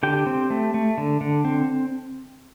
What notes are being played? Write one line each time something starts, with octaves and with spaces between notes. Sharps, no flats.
D3 G4 G5
C4
A3
A3
D3
D3
C4